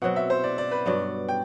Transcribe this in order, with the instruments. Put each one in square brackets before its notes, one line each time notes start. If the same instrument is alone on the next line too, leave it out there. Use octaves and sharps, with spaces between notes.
[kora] B2 F#3 C4 [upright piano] F#5
[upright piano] E5
C5
D5
D5
B4
[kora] G2 F#3 B3 [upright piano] D5
[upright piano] G5